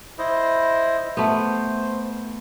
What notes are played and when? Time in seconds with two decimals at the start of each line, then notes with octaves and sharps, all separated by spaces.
0.18 E4 C5 D#5
1.17 A3 B3 C5